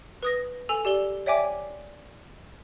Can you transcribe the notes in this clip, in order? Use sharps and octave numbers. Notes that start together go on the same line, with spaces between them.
B4 D#6 A#6
A4 G#5 E6 F7
G4 D5 G7
C#5 D5 E5 G5 G#5 D6